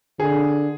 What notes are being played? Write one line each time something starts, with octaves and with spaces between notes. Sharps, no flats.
D3 G#4